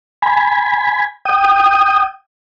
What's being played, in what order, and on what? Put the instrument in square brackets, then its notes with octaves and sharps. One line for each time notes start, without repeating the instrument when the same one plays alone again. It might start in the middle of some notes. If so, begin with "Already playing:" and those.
[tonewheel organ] G#5 B5
G5 D#6